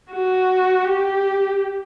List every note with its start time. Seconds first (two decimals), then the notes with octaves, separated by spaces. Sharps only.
0.12 F#4
0.85 G4